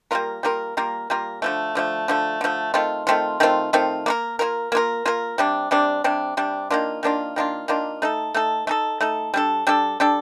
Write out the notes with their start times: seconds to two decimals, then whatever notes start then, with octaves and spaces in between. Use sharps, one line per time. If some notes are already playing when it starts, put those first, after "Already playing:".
0.11 G3 A#3 F4 A#4
0.43 G3 A#3 F4 A#4
0.77 G3 A#3 F4 A#4
1.10 G3 A#3 F4 A#4
1.42 D3 F3 A3
1.75 D3 F3 A3
2.08 D3 F3 A3
2.41 D3 F3 A3
2.74 D#3 A3 C4 F4
3.07 D#3 A3 C4 F4
3.40 D#3 A3 C4 F4
3.73 D#3 A3 C4 F4
4.06 A#3 F4 A#4
4.39 A#3 F4 A#4
4.72 A#3 F4 A#4
5.05 A#3 F4 A#4
5.38 C3 G3 D4
5.71 C3 G3 D4
6.04 C3 G3 D4
6.37 C3 G3 D4
6.70 D#3 A#3 D4 F4
7.03 D#3 A#3 D4 F4
7.36 D#3 A#3 D4 F4
7.68 D#3 A#3 D4 F4
8.02 A3 D#4 A4
8.34 A3 D#4 A4
8.67 A3 D#4 A4
9.01 A3 D#4 A4
9.34 G3 D4 A4
9.67 G3 D4 A4
10.00 G3 D4 A4